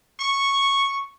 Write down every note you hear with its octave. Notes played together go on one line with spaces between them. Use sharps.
C#6